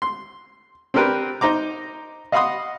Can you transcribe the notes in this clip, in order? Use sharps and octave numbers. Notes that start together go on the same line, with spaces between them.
C6
C4 D4 G4 A#4 B4
D#4 C5 A#5 D6
D#5 F5 F#5 B5 C6 D#6